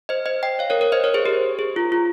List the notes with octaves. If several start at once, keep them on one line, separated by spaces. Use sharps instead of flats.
C5 D#5
C5 D#5
D#5 G5
C#5 F5
A#4 C#5
A#4 C#5
C5 D#5
A#4 C#5
G#4 C5
G4 A#4
G#4
F4
F4